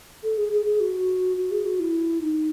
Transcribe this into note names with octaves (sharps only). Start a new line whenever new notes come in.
A4
G#4
G#4
G#4
F#4
F#4
G#4
F#4
E4
D#4